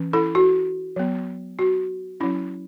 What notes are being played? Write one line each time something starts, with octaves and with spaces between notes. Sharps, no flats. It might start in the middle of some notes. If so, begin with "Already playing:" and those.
Already playing: E3 C#4
E4 A4
F#4
F#3 B3
F#4
F#3 C#4 E4